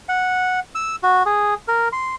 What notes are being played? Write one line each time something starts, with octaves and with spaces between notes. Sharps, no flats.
F#5
E6
F#4
G#4
A#4
C6